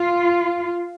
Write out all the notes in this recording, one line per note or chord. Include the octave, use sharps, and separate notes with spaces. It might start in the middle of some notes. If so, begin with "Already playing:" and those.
Already playing: F4